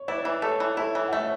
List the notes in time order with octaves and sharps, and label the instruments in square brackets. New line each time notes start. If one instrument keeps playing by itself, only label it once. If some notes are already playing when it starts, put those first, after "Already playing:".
Already playing: [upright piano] C#5
[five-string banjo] E4 [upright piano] B4 D5
[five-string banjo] E3
[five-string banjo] A3 [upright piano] A4 C#5
[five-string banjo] E3
[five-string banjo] E4 [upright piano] A4 C#5
[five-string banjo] E3
[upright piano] F#5
[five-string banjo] A3 [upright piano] C#5 E5